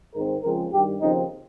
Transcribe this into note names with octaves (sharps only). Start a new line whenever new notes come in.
G#2 D#3 G#3 C4 A#4
C#2 C#3 F3 G#3 C4 A#4
G2 D#3 G3 G4
D#2 C#3 F3 C4 D#4